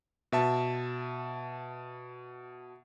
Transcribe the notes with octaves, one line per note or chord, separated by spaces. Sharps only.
B2 E5 A5